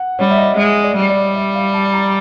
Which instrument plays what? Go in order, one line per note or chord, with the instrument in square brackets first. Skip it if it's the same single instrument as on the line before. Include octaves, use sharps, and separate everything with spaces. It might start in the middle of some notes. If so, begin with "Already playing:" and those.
Already playing: [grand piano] F#5
[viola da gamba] G3 [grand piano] C#5
[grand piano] E5
D#5
[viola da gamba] G#3 [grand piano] E5
[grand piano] D5
[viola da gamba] G3
[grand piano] D5
E5
F5
A5
A#5